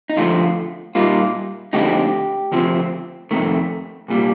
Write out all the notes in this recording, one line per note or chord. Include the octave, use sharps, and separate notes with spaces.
D#4
F2 D3 F3 A3 F4
A#2 G3 A#3 D#4 F4
F2 D3 A3 C4 D#4 G4
D2 C3 F3 C4
F2 C3 D#3 A3
C2 A#2 G3